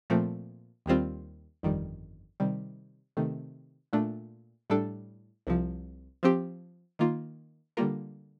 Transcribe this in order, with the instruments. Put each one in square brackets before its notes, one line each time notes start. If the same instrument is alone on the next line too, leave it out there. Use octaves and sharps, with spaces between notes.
[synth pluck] A#2 F3 A3 C4
D#2 D#3 G3 C4 F4
G1 F2 D#3 G3
C3 D#3 G3
C3 D#3 A3
A#2 A3 D4
A2 G3 D4 A4
C2 C3 F3
F3 C4 G4
D#3 A#3 F4
D3 G3 A#3 F4 A#4